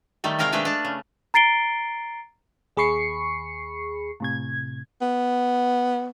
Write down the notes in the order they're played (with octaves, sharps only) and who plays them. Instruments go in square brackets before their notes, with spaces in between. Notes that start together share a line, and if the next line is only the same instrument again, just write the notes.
[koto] D#3 G3 A3
C3 G#3 A#4 F5 G5
G#3 A3 D4 B4 F5
D4 A5
C#3
[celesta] A#5 A6 C7 D7 G7
[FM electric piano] D#2 G#4 B5 C#6 C7 C#7
A2 C3 G#6
[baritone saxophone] B3